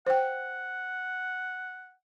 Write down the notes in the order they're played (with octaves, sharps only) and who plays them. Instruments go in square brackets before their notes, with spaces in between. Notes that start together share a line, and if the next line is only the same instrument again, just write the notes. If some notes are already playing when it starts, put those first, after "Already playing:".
[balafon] C5 G5 [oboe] F#5